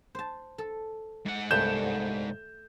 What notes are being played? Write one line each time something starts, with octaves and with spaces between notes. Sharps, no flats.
C5 A5
A4
G#2 F#5
C2 G2 A3 B3 G6 E7